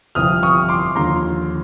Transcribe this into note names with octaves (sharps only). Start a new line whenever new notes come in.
G1 F2 C3 E3 D#6 F6
C#6 D#6
C6 D6
D#2 D3 F3 A#5 C6